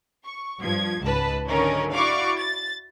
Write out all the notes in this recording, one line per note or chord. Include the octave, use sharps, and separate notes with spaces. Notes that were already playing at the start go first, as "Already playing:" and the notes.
C#6
G2 F3 G#6
C#2 G#2 B4 A5
D3 D#3 F#3 C#4 D#4 A#4
E4 F#4 D5 F5 C#6 D6
A6